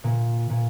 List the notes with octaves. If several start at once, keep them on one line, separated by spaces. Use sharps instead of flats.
A#2
A#2